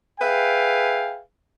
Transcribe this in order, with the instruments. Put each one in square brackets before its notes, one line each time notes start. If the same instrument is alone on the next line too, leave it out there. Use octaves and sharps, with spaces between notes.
[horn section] G#4 B4 E5 F5 G5 G#5